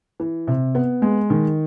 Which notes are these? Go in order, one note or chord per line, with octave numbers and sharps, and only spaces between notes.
E3
C3
B3
G#3
D#3